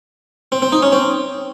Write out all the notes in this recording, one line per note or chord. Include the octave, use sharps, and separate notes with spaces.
C4
C4
D#4
C#4
C4